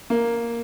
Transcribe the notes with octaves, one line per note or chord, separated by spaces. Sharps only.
A#3